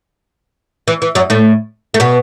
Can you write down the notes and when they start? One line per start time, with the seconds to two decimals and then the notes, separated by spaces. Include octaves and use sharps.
0.88 E3
1.02 E3
1.15 F#2 F#3
1.30 A2 A3
1.94 A3
2.00 B2 B3